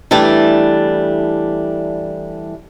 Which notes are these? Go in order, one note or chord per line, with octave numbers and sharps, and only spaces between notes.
E3 G3 A3 D4